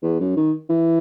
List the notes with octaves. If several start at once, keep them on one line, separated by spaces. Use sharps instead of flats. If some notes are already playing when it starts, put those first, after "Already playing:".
E2
F#2
D#3
E3